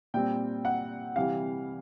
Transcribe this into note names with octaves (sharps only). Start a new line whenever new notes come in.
A#2 G3 C4 G5
F#5
C3 E3 G3 F5